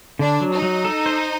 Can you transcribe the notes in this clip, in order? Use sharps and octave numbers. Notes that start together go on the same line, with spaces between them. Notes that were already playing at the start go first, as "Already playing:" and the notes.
D3 D4
F#3
D#4
F#3
A4
C5